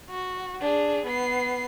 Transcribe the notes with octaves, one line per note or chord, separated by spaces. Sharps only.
F#4
D4 G#4
B3 C7